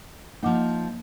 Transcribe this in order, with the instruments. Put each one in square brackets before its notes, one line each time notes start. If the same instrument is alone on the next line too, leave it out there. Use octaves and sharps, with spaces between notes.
[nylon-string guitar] F3 D#4 [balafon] A#3 F#5 D6